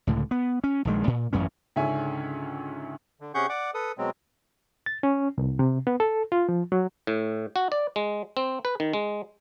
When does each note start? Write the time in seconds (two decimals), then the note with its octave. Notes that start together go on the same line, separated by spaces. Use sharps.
0.07 C#2 A2 D3
0.31 B3
0.64 C#4
0.85 A#1 D#3 G#3
1.07 A#2
1.33 A1 F#2 E3 C#4
1.76 C#2 G#2 D3 C#4 E5 G#5
3.21 D3
3.34 C3 C#4 G#4 F#5 C#6 G6
3.49 D5 F#5 D6
3.74 A4 B4 D#6
3.98 B2 F#3 G#3 C4
4.86 A6
5.03 C#4
5.38 C2
5.59 C3
5.87 B3
6.00 A4
6.32 F4
6.49 F3
6.72 F#3
7.07 A2
7.56 F#4
7.72 D5
7.96 G#3
8.37 C4
8.65 B4
8.80 D#3
8.93 G#3